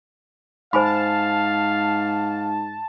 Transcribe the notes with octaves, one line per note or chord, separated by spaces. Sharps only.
G#2 C5 F5 G#5 A5 B5